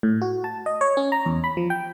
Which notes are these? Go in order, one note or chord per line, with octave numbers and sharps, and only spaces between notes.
A2
F#4
A5
D#5
C#5
C#4
A#5
E2
B5
F3
G5